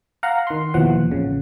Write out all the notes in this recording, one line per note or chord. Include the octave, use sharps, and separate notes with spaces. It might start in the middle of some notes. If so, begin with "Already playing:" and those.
F5 F#5 A#5
D#3 C6
D#2 B2 E3 F3 F#5
A1 C#3